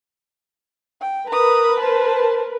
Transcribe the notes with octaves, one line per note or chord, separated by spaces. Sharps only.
G5
A#4 B4 A#5 D#6
C5 A5